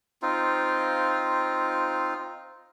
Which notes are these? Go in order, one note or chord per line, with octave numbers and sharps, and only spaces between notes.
C4 D#4 F4